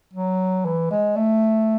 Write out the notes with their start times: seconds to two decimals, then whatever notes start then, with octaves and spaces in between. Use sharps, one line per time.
0.13 F#3
0.65 E3
0.91 G#3
1.16 A3